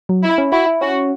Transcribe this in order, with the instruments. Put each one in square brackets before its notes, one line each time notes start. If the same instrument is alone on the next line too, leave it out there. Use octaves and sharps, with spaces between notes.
[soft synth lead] F#3
[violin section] E4
[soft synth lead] C#4
[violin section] E4 [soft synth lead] F#4
[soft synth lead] E4
[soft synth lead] C#4 [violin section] F#4